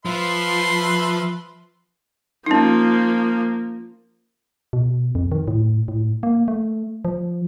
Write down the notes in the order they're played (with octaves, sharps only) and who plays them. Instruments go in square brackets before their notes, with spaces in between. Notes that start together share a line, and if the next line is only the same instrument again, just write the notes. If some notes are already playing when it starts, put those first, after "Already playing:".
[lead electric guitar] F3 [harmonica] B4 E5 C6
[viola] F3 A#3 [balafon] C#4 D#4
[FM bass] B2
F2
D#3
A2
A2
A#3
A3
F3